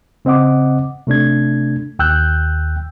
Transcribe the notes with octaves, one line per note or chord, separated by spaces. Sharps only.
C#3 C4 D#5 F#5 D6
C3 A3 D4 G#6
D#2 G5 E6 F#6 G6